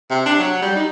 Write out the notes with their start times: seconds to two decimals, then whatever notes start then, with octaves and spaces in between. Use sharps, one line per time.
0.10 C3
0.26 D4
0.39 F#3
0.62 G3
0.75 D#4